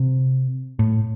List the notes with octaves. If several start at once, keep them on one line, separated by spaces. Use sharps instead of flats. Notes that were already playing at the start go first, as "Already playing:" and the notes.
Already playing: C3
A2